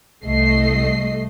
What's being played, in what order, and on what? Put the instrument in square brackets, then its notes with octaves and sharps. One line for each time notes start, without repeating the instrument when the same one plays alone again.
[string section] C2 A3 D#5 C7